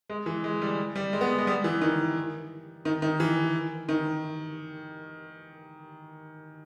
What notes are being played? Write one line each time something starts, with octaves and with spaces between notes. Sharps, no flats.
G#3
E3
G#3
G3
G3
G#3
B3
G#3
G3
E3
D#3
D#3
D#3
E3
D#3